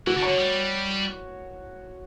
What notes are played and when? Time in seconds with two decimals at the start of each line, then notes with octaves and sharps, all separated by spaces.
0.07 E3 F#4
0.17 D3
0.22 C#5
0.28 D3
0.38 G3